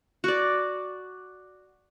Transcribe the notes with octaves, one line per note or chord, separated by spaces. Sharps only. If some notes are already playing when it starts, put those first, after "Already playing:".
F#4 D5